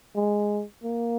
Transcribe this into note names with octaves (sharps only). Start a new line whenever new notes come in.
G#3
A#3